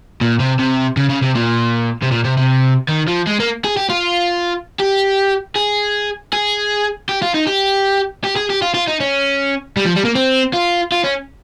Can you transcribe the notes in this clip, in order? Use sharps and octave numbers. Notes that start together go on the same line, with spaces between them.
A#2
C3
C3
C#3
C#3
C3
A#2
C3
A#2
C3
C3
D#3
F3
G#3
A#3
G#4
G4
F4
G4
G#4
G#4
G4
F4
D#4
G4
G4
G#4
G4
F4
F4
D#4
C#4
G3
F3
G3
A#3
C4
F4
F4
C#4